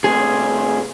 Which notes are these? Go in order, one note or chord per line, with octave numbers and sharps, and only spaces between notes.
A2 C3 G#4